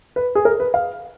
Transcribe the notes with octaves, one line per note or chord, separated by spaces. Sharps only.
B4
G#4
A#4
B4
F5